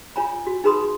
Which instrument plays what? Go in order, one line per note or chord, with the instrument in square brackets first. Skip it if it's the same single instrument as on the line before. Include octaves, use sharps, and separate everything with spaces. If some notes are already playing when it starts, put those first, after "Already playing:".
[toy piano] F4 C#5 G#5 B5
F#4
D#4 G#4 B4 B5 C6 D#6